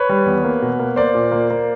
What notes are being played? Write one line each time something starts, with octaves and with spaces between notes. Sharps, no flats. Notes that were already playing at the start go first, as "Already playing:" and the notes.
Already playing: B4 C#5
G3
E2
A#3
B2
A#3
A#3 C5 D5
A#2
A#3
A#3